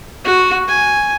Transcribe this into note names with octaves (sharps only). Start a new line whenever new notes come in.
F#4
G#5